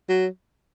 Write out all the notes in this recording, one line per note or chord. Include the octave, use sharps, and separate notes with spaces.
F#3